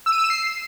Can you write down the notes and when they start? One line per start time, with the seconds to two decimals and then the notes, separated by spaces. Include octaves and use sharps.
0.06 E6
0.12 D#7
0.18 E6
0.24 E7
0.30 C7